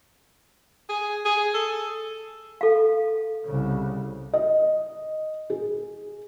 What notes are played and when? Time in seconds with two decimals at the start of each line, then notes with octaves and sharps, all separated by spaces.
0.89 G#4
1.25 G#4
1.54 A4
2.61 A4 F5
3.45 C2 C#3
4.33 D#5
5.50 G#4